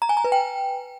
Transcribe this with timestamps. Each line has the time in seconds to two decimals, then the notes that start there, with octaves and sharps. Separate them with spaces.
0.02 A#5
0.09 G#5
0.17 A#5
0.24 B4
0.32 G5